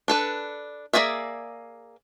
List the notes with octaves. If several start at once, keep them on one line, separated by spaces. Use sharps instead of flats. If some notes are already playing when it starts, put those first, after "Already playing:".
D4 A4 B4
A#3 F4 G#4 D5 E5